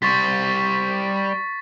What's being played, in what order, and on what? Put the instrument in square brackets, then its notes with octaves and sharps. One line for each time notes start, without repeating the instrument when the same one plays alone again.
[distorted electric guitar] G3 C5 [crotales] C#6 A6 B6